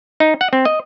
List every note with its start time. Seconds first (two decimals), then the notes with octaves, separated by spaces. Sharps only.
0.20 D#4
0.41 F#5
0.53 C4
0.65 D#5